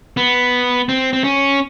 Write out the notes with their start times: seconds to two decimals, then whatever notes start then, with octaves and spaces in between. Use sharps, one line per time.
0.17 B3
0.89 C4
1.13 C4
1.24 C#4